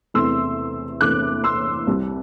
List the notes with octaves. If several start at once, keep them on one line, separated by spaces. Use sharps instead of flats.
E2 C3 E3 A3 C6 E6
E2 C3 E3 A3 D6 F#6
C6 E6
C2 C3 G3